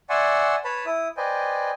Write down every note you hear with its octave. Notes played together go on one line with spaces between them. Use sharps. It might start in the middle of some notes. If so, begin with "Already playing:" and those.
D5 E5 F#5 G#5 C6 C#6
B4 C#5 A5 B5
E4 D#6
B4 C5 D5 D#5 G5 G#5